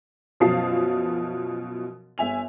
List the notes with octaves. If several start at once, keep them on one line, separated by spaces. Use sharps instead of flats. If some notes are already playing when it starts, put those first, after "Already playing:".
F#2 B2 F3 F5 A5 C7
G1 E5 G#5 F7